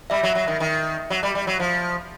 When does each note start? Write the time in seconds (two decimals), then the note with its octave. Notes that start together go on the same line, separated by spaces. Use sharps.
0.10 G3 E5
0.23 F#3
0.35 F#3
0.48 D#3
0.60 D#3
1.10 F#3
1.23 G3
1.35 G3
1.47 F#3
1.60 F3